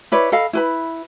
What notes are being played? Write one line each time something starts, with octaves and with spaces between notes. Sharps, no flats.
E4 B4 C#5 D5
A4 D#5 F5 B5
E4 B4 B5